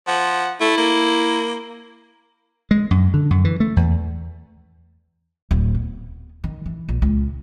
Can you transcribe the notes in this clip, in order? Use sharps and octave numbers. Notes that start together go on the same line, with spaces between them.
F3 F#5
A3 E4
A#3
G#3
F#2
D3
F#2
E3
A3
E2
D1
B3
D#3
E3
A#1
C#2